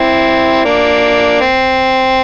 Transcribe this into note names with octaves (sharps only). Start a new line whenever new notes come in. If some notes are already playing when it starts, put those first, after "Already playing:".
Already playing: C4 E4
A#3 D4
C4